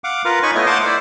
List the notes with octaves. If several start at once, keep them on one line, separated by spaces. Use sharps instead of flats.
F5 F#5 D6
F4 A#4 B4 F5
D#4 C#5 G#5 B5 C#6
A3 B3 E4 C#5 D#5
C5 F5 F#5 A5 C6 D6
E4 C5 D5